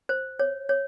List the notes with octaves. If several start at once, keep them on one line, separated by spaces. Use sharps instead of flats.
C5
C#5
C#5